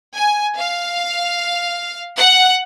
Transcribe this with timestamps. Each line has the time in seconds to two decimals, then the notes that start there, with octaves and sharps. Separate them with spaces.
0.15 G#5
0.58 F5
2.18 F#5